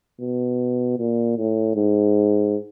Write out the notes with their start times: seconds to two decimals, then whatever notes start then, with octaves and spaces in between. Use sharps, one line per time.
0.21 B2
0.98 A#2
1.37 A2
1.76 G#2